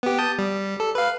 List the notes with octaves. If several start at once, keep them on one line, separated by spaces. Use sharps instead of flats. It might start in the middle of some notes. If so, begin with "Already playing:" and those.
B3 G4
A5 D#6 G6
G3
A4
B4 F5